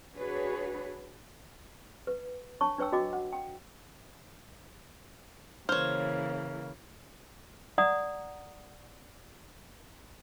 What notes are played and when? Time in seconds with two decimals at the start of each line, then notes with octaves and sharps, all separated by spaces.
0.14 D4 F#4 G#4 B4 C#5
2.07 B4
2.61 D4 C#5 A5 C#6
2.78 D4 B4 C#5 G5 E6
2.92 F#4 D#5 G5 D6
3.13 F#5
3.33 G5
5.69 C#3 E3 A#3 C5 C#5 F6
7.78 D5 F#5 A#5 D#6